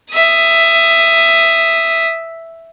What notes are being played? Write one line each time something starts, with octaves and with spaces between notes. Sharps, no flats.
E5 D#6